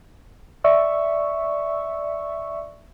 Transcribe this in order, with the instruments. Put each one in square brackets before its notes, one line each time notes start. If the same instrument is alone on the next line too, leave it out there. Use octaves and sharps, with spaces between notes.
[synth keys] D5 E5 C#6 E6